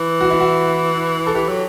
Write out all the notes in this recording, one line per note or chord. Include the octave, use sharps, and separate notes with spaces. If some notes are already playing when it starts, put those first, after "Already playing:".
Already playing: E3
F#4
E4
F#4
A4
E3 G4
F#3